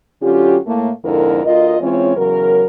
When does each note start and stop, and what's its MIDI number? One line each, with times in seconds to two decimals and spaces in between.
0.22 0.56 50
0.22 0.56 54
0.22 0.56 61
0.22 0.56 65
0.22 0.56 67
0.66 0.90 45
0.66 0.90 57
0.66 0.90 58
1.04 1.44 41
1.04 1.44 44
1.04 1.44 50
1.04 1.44 64
1.04 1.44 70
1.45 1.78 38
1.45 1.78 65
1.45 1.78 70
1.45 1.78 75
1.81 2.14 52
1.81 2.14 56
1.81 2.14 60
1.81 2.14 61
1.81 2.14 65
1.81 2.14 73
2.17 2.65 40
2.17 2.65 49
2.17 2.65 54
2.17 2.65 70